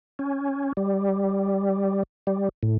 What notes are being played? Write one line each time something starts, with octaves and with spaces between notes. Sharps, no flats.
C#4
G3
G3
A2